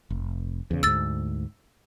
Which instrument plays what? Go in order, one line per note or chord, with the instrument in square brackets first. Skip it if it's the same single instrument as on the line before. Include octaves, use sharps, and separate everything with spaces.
[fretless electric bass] F1
E2 C#3
[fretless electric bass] D2 G#2 [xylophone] E6 A6